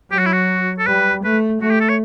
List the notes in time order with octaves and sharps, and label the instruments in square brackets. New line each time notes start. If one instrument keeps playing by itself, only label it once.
[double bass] F#3 [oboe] G4
[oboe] F#4
E4
F#4
A4
[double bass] G3 [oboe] B4
[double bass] A3 [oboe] B4
[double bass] A3 [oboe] F#4
[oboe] G4
A4
C#5